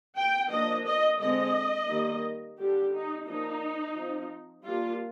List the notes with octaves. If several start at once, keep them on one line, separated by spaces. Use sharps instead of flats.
G5
F3 A#3 D4 D#5
D#5
D3 G#3 C4 D#5
D#3 G3 A#3
D3 G3 D4 G4
D#4
F3 A#3 D4 D#4
F3 C4
G3 A#3 D4 F4